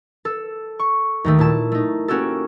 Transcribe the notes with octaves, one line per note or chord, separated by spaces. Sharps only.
A4
C#6
D#2 D#3 A3
A#2 E4 A5
A3 D#4
A#3 C#4 F#4 G4 A4